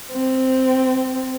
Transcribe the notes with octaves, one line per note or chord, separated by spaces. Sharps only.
C4